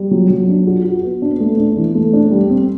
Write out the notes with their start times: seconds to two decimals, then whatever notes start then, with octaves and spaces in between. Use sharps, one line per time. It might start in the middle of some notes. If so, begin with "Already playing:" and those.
Already playing: G3
0.11 F#3
0.30 F#3
0.48 D4
0.67 F#4
0.85 F#4
1.04 B3
1.22 D4
1.40 A3
1.57 D4
1.77 E3
1.95 A3
2.13 D4
2.31 G3
2.50 C4